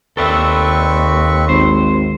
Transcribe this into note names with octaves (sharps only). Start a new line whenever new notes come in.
D#2 C4 A4 B4 D5 E5 C#6
G#1 C5